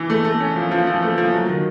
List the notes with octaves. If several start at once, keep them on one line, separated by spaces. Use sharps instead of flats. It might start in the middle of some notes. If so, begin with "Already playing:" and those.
Already playing: E3
A3
A3
C#4
F3
F3
F3
A3
F3
F#3
D#3